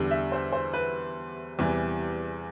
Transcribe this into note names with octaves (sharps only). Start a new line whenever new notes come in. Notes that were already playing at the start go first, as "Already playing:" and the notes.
Already playing: E2 D3 G3
E5
C5
C5
B4
E2 C3 E3 G3